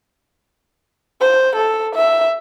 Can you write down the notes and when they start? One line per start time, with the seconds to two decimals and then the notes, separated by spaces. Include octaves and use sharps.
1.21 C5
1.56 A4
1.95 E5